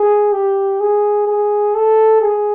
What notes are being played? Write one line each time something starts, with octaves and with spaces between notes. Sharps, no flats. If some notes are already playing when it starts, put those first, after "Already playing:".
Already playing: G#4
G4
G#4
G#4
A4
G#4